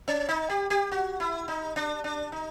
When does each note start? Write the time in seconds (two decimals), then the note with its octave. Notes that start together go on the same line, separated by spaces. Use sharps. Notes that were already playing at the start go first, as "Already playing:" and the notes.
0.08 C#4
0.28 D#4
0.50 G4
0.70 G4
0.91 F#4
1.20 E4
1.48 D#4
1.76 D4
2.04 D4
2.32 D#4